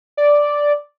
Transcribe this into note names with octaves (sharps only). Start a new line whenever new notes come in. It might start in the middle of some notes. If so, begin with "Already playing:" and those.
D5